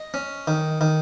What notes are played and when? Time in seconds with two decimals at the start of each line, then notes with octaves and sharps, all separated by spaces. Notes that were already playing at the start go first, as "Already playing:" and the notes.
Already playing: D#5
0.14 C#4
0.48 D#3
0.81 D#3